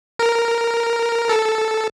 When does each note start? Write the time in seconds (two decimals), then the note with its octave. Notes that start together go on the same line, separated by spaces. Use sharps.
0.19 A#4
1.29 A4